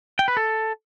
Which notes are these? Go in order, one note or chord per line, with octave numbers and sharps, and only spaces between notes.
G5
B4
A4